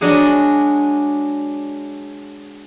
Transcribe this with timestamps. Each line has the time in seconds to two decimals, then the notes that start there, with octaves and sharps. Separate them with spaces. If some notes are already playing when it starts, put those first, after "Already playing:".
0.01 F#3 G#3 D4 F#4 G#4